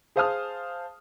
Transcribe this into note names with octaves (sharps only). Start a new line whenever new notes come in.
G#4 C5 F5 A5 D#6 F6